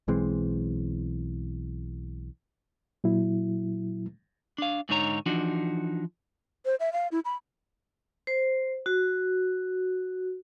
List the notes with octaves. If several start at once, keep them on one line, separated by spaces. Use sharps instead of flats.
B1 E3 G#3 C4
A#2 F#3 E4
D4 F5
G#2 D3 D#4 C#5 A#5
E3 F3 D4 D#4 F#4
C5
E5
F5
E4
B5
C5
F#4